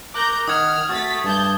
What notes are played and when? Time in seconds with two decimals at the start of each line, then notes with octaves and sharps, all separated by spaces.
0.14 A#4 A#5 D6 F#6 G6
0.48 D#3 F#5 D#6 F6 G#6
0.89 A3 F#4 A6 B6
1.24 G2 A5 G6